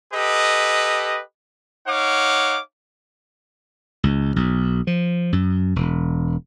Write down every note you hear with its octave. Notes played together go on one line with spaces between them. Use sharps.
G4 A4 B4 D#5
D#4 C#5 F5 F#5 D6
C#2
B1
F3
F#2
E1